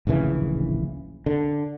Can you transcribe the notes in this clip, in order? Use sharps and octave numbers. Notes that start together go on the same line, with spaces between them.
D1 A#1 C#3 E3
D3